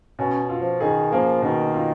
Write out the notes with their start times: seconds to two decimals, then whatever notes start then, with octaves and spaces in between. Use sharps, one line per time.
0.19 B2 C#4
0.49 F4
0.61 F3
0.80 D#3 G#4
1.12 F3 A#3
1.42 B2 D#3
1.74 F4